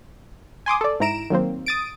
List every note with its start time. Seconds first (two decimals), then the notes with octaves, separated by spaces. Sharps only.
0.66 G#5 C6 D6 D#6
0.81 A4 D5
1.00 G#2 E4 A#5 D7 E7
1.30 D#3 F#3 A#3 C4
1.66 D#6 A6 D7